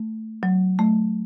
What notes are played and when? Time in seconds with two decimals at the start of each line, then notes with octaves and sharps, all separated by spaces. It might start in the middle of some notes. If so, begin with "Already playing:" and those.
Already playing: A3
0.43 F#3
0.79 A3